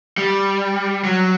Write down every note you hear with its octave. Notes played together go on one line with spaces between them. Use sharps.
G3
F#3